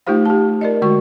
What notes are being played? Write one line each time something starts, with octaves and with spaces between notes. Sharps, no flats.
A3 D#4 F4 G4 C5 F5
G4 A5
A#4 D5 D#5
D3 G#3 F#4 C#6